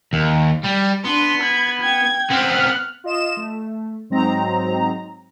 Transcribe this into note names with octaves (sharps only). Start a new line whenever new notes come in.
D#2
G3
B3 D4 C6
B5 G#6
G5 G#6
B3 C4 F6 F#6
F4 D#5 E7
A3
G#2 F#3 C4 D#4 A#5